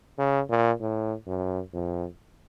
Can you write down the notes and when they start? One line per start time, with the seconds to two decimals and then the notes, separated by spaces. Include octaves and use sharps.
0.19 C#3
0.50 A#2
0.81 A2
1.27 F#2
1.73 F2